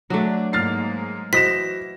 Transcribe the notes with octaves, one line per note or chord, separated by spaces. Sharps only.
F#3 A3 D4
G#2 G#3 A#3 F6 A6 C7
E3 F#4 C5 D#5 A#6 B6 E7